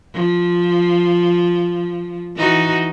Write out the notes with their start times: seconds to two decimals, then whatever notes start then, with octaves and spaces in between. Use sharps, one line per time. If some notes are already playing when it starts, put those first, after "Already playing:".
0.14 F3
2.36 E3 D#4 F#4